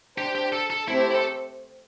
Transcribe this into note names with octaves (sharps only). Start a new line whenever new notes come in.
D4 G4 C5 G5
G4
A4
A4
A3 C4 E4 G4 C5
A4